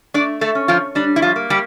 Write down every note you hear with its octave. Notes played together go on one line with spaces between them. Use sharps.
A3 D4 D5
A3 A4
C#4
F3 F4
G3 D4
E4
F3 F4
A#3
G3 G4